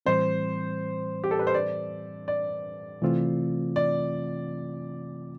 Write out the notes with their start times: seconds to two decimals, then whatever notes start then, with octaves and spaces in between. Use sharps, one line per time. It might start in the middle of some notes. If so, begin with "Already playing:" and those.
0.06 A2 E3 G3 C4 C5
1.24 G4
1.31 A4
1.39 B4
1.47 C5
1.54 D5
2.28 D5
3.02 C3 E3 A3 C4 F4
3.76 D5